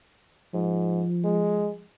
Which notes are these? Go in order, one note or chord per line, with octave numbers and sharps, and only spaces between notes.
G#2 F3
G#3